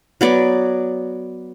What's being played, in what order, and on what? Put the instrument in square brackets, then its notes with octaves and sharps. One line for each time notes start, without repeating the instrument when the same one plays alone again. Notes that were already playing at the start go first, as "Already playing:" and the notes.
[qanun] F#3 B3 D5